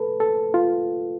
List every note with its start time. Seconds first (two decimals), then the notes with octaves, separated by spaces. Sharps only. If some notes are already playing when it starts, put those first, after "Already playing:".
Already playing: A4 B4
0.20 A4
0.54 F4